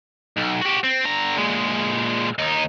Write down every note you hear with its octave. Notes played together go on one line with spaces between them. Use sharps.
B1
F#4 G4
C4
D3 A#5
A#2 G#3
D#2 D#4